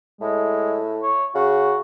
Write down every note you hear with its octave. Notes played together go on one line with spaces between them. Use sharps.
A2 G#3
C#5
C#3 F#4